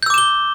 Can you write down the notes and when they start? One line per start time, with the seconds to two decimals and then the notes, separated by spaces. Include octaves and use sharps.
0.03 G6
0.06 E6
0.10 D6
0.14 E7
0.18 G7